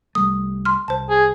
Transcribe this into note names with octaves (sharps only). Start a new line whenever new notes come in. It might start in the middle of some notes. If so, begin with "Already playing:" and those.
C2 G3 A3 D#6
C6 F6
C2 C5 A5
G#4